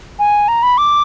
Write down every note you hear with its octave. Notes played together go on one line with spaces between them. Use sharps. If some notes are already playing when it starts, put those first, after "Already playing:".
G#5
A#5
B5
D6